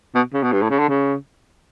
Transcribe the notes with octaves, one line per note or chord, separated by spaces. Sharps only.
B2
C#3
B2
G2
A2
C#3
D3
C#3